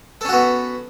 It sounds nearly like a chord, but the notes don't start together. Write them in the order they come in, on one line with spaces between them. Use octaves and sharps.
A4 C#4 F#4 B3